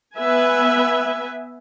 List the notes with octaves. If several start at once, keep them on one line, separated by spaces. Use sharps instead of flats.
B3 B4 E5 G#5